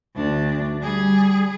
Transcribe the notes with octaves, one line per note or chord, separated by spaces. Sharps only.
D2 D4
G3 G#4